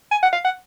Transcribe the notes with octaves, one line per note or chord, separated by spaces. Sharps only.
G#5
F#5
F5
F#5